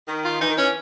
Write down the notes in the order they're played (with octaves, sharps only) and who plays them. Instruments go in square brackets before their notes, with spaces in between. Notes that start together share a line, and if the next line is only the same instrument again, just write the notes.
[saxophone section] D#3
[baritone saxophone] F4
[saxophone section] E3 [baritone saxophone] D#4
[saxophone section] D#3
[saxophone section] E3 [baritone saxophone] C#4